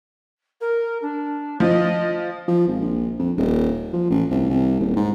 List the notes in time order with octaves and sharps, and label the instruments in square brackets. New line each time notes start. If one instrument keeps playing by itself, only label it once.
[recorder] A#4
D4
[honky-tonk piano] F3 [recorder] D#5
[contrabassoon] F3
G#1
A#1
F2
D#1
F3
A1
C2
C2
D#1
G#2